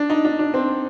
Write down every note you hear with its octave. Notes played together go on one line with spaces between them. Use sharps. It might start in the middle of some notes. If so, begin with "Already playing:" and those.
Already playing: D4
D#4
D4
D4
C4